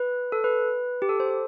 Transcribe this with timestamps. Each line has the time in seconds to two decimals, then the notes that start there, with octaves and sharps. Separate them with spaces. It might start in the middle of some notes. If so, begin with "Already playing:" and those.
Already playing: B4
0.32 A4
0.44 B4
1.02 G4
1.09 A4
1.20 C5
1.30 C5